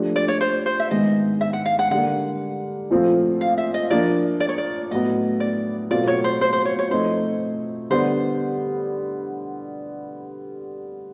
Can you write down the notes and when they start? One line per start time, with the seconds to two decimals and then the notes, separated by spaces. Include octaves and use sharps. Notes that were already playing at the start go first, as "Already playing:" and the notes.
Already playing: F3 A3 D4 G4
0.16 D5
0.28 C#5
0.41 C5
0.66 C5
0.80 E5
0.91 G#2 D#3 G#3 B3 D#5
1.41 E5
1.53 F#5
1.66 F5
1.79 F#5
1.91 D3 G3 A#3 F#5
2.90 A#2 F3 A3 C4 F4
3.41 F5
3.58 E5
3.74 D#5
3.90 F3 A#3 D4 D5
4.40 D5
4.49 C#5
4.58 D5
4.91 A2 F#3 B3 D#5
5.40 D5
5.91 B2 F#3 A3 C4 F4 D5
6.08 C#5
6.24 C5
6.41 C5
6.53 C5
6.65 C#5
6.79 C#5
6.90 F3 A3 C4 D#4 C5
7.90 D3 G3 B3 C5